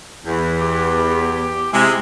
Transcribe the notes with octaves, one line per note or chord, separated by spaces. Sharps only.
E2
G4
C3 G#3 E4